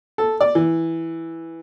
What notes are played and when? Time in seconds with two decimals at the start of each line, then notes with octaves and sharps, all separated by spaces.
0.18 A4
0.41 D5
0.55 E3